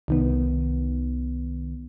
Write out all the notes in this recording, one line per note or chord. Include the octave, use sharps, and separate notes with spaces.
C2 D#3 B3